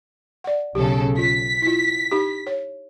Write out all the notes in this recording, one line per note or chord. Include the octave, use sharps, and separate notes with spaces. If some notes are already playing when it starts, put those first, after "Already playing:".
D5 F#5
B1 C#3 G4 A4
F4 B6
E4 F4
D#4 G4
C#5